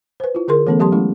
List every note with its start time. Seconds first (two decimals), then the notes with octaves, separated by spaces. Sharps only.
0.20 B4 C5
0.35 E4 F4
0.48 D3 G#4 A#4 C6
0.67 E3 A3 B3 C#4 A4
0.80 F#3 G4 A5 C6
0.92 G#3 A3 C#4 E4